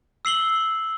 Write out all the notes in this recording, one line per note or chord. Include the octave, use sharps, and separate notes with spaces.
E6 C7 F#7 G7